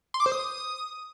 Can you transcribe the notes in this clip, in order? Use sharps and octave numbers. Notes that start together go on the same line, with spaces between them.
C6
D6
C5
D#6